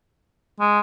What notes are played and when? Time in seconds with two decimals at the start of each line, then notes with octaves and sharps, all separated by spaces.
0.60 G#3